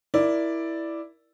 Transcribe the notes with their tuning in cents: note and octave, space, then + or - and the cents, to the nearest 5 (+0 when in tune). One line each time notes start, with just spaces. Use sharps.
E4 +0 A#4 +15 D5 +0